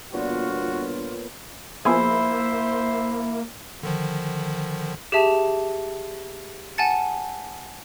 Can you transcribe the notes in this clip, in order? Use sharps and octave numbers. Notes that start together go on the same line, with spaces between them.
G1 A#2 B3 F4 F#4 C#5
F3 A#3 B3 E4 G#4 C5 E5
D3 D#3 F3
G4 G#4 E5 A5
F#5 G#5 A5 A6 C#7